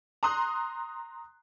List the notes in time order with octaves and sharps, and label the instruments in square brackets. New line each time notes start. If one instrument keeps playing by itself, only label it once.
[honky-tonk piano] A#5 C6 D#6 F#6